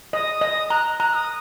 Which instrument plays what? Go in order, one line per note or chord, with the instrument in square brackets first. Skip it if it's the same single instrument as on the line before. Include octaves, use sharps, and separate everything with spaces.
[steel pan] D#5 [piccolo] D#6
[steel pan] D#5
[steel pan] A#5 [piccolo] F#6
[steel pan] A#5 [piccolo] F#6
[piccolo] D#6